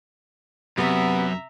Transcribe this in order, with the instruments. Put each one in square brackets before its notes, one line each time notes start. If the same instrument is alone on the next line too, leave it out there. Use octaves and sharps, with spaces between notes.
[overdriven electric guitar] F#2 [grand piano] C3 [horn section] B3 [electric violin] E5 A#5